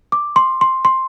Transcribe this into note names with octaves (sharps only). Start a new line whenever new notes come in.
D6
C6
C6
C6